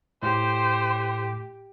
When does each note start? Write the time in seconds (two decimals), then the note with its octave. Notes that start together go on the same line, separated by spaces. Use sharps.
0.23 A2 G4 C5